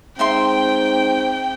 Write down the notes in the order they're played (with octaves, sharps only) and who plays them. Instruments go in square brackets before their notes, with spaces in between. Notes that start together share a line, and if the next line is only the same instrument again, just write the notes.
[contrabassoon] G#2 [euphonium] C4 [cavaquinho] D#4 E5 C6 [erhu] G5